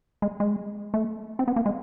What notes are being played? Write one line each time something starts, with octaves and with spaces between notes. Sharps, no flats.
G#3
G#3
A3
C4
B3
A#3
G#3